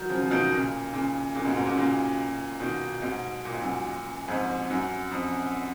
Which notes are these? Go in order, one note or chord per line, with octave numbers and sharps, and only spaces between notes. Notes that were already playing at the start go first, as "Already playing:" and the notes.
Already playing: D#3 F#3
C#3 F3
C#3 F3
B2 D#3
A#2 C#3
A#2 C#3
A#2 C#3
G#2 B2
G#2 B2
A#2 C#3
A#2 C#3
B2 D#3
G#2 B2
A#2
G#2
F#2 A#2
F2 G#2
F#2
F2